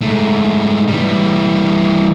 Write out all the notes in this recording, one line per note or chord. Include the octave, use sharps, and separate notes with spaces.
G#2 A3
E3 G3